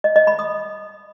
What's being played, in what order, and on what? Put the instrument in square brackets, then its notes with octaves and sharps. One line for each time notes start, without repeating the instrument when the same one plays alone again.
[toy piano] D#5
D#5
B5
D#6